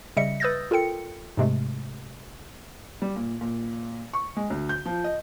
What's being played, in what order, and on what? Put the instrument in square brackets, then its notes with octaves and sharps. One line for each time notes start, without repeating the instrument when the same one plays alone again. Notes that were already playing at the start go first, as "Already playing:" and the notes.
[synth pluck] C#3 G3 D#5 E5 C#7
B4 D#6 E6 G6 A6 A#6
F4 A4 A#4 G5 C#7
G#2 C3 G#3 A3
[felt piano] G3
A#2
A#2
C#6
G#3
D2
G6
F3
D#5